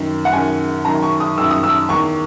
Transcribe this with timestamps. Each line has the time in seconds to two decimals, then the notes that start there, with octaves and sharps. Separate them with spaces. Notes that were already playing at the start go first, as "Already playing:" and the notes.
Already playing: F#2 D#3
0.25 F#5
0.33 F#2 D#3 G#5
0.85 F#2 D#3 A#5
1.03 C#6
1.20 D#6
1.37 D#3 E6
1.40 F#2
1.51 D#6
1.63 E6
1.89 E2 D#3 C#6